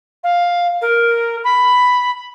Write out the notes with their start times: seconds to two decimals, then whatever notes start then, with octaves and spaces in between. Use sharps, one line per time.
0.24 F5
0.81 A#4
1.44 B5